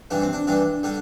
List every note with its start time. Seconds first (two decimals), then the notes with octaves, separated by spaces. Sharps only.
0.11 G2 E3 G3 D4
0.22 C4
0.33 D4
0.47 G2 E3 G3 D4
0.83 D3 G3 D4